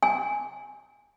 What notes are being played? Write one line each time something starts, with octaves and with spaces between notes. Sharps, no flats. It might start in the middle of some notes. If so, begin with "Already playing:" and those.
G#5